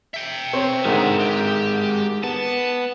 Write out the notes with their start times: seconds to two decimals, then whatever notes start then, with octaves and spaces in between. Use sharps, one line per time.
0.14 E5 G5
0.53 C4 C#5
0.85 G#2 D3 D#3 G#3 A#4
1.20 G4
2.24 B3 A5